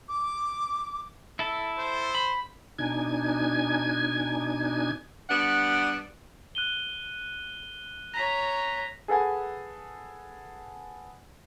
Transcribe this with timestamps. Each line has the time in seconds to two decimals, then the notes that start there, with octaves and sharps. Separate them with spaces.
0.09 D6
1.39 E4 A4
1.79 C5
2.15 B5
2.79 B2 D4 D#4 G#5 G#6
5.29 G3 B3 D4 F#5
6.55 F#6 D#7 G7
8.14 C#5 A#5 A#6 B6
9.08 G#4 A4 B4 F#5 G#5